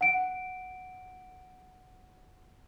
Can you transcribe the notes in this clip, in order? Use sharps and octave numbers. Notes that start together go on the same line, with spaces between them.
F#5 D7